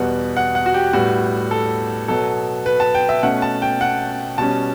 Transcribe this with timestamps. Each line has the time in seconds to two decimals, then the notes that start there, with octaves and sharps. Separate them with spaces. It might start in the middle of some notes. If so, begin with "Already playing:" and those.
Already playing: E2 B2 G3 B3 F#5
0.37 F#5
0.55 F#5
0.66 F#4
0.74 G4
0.93 A2 G3 B3 F#4
1.51 A4
2.08 B2 F#3 B3 A4
2.66 B4
2.80 A5
2.95 G5
3.09 E5
3.23 B2 A3 C#4 F#5
3.42 A5
3.62 G5
3.81 F#5
4.38 B2 G3 C#4 A5